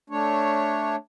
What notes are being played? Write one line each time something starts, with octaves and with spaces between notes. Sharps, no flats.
A3 D4 C#5